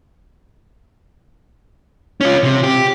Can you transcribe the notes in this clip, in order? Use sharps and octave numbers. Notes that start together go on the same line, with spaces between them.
C#4 F4
C3
G4